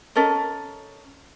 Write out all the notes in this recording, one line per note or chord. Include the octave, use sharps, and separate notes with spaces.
C#4 A4 A#4 D#5